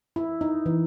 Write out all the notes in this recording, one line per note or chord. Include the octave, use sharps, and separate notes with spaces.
E4
D#4
E3